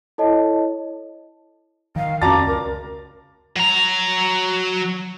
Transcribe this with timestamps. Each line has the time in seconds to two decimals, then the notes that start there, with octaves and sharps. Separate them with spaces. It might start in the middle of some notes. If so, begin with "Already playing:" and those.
0.18 E4 A4 C#5 D#5 A5
1.96 D#3 F5
2.22 F2 C#4 F#4 D5 A5 A#5 D6 A6
2.46 C#2 A#4
3.56 F#3 A#5